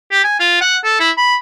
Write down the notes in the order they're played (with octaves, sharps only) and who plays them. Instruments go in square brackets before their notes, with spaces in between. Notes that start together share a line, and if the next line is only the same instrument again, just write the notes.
[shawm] G4
G#5
F4
F#5
A4
E4
B5